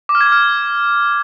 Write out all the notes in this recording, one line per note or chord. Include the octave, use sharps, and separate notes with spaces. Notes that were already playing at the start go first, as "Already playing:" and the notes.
D6
F6
G#6
D6
F6